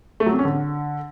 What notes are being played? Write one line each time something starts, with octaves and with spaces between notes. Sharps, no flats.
A3
F#3
C3
C#4
D3